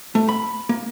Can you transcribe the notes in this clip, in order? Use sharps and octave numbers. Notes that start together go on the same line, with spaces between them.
A3
B5
A#3